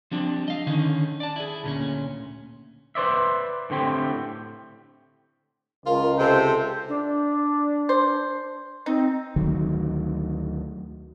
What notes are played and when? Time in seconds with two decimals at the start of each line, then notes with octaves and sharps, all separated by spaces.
0.11 F3 G3 C4 D4
0.48 D#5 F5
0.67 D3 D#3 C#4 D#4
1.20 D5 A5
1.36 E4 G#4
1.63 D2 A#2 C#4
2.95 B4 C5 D5 E5
3.70 A2 D3 C4 G4
5.86 C#2 F4 A#4
6.19 C3 A4 C5
6.89 D4
7.89 C5
8.86 C4 D#4
9.36 D2 D#3 F#3 A3